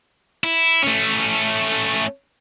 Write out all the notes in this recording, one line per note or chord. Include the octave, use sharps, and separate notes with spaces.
E4
A3 C#4